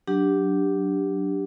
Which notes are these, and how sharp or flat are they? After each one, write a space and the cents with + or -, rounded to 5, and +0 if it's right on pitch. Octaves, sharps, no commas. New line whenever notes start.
F#3 +5 D4 +0 G4 +0